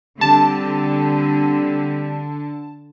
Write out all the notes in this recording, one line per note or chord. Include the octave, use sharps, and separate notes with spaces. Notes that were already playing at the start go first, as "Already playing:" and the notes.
D3 G3 C4 G4 A5